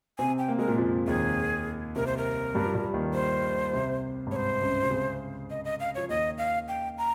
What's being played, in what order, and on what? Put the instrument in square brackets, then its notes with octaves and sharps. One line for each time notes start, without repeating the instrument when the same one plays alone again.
[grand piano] C3 C4 [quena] G#5
[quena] G5
[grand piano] A#3
[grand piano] G#3 [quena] A#4
[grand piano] A#2 A#3
F2 F3
[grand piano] D#2 D#3 [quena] G#4
[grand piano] C2 C3 [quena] A#4
[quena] C5
A#4
[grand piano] G2 G3
F3
G2 G3
D#2 D#3
[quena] C5
[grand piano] C2 C3
G2
[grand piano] G#2 [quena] C5 C#5
[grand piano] C#2 C#3
C3
C#2 C#3
[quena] D#5
D#5
F5
[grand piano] F3 [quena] C#5
[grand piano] D#2 D#3 [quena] D#5
[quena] F5
G5
A#5